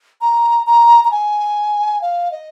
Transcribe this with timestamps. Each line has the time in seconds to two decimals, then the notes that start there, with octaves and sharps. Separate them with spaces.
0.21 A#5
0.67 A#5
1.05 A#5
1.11 G#5
2.02 F5
2.32 D#5